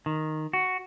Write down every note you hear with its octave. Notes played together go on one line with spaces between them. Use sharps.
D#3
F#4